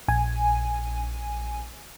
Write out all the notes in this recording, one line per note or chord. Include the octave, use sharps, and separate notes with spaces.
A#1 G#5